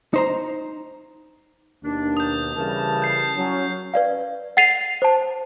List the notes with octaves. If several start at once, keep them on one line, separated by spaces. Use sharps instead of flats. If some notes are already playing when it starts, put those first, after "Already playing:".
D#4 C5 A#5
D#2 B2 D#3 D4
D#6 G6
C#3 E3 G3 A#4 A5
G6 C7
F#3 C#4
B4 D5 F5
F#5 A6 C7 D#7 F7
C5 A5